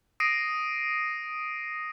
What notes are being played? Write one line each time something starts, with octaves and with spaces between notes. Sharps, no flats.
D#6 A#6 C7 D7 D#7